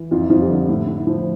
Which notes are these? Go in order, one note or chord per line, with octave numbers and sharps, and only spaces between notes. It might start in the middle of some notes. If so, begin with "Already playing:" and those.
Already playing: E3
F2 F4
E4
F2 F3 F4
G3 G4
D3
A2 E4
A2
E4
F3